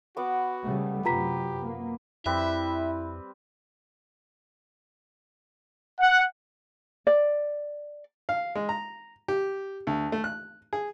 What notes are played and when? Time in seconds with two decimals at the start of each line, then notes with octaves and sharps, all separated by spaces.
0.17 B3 F#4 F#5 D6
0.64 C#3 G3 A3
1.05 F#2 C3 F4 G4 B4 A#5 B6
1.64 A#3
2.26 F2 G3 C4 E4 B4 E5
6.00 F#5
7.07 D5
8.29 F5
8.56 G#3
8.69 A#5
9.28 G4
9.87 D2
10.12 A3
10.24 F#6
10.73 G#4